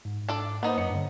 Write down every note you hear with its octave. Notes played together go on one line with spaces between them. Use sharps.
G#2
D4 A4 D5
A#3 B3 D#4 B4 C5
F#2 C#5 C#7
G2 D3